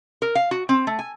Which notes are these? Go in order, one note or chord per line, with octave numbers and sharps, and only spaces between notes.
A#4
F5
F#4
C4
A3
G#5